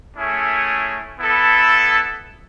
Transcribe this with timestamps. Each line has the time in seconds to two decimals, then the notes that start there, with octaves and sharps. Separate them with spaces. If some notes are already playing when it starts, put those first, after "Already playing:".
0.16 A3 C#4 E4 G#4 C#5
1.19 B3 E4 A4